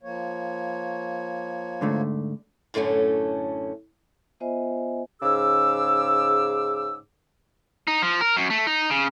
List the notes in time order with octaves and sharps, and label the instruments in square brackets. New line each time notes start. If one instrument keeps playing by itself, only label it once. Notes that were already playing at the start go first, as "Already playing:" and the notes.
[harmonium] F3 A#3 C#5
[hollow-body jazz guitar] G#2 D3 A3
[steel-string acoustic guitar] F#2 A2 D3 A3 C#4
[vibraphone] B3 F4 C5 D#5 E5 G#5
[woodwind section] G#2 C#3 G#4 D6 E6
[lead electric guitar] D#4
F3
A#4
F#2
A3
D#4
C#3